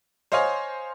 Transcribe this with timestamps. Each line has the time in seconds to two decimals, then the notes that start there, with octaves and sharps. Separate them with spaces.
0.32 C5 C#5 D#5 F5 G#5